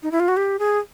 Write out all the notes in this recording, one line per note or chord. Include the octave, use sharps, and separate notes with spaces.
D#4
E4
F4
F#4
G4
G#4